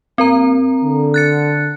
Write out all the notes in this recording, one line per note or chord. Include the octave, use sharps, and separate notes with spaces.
G2 A#3 C4 A#4 A#5
D3
F#6 A6 C#7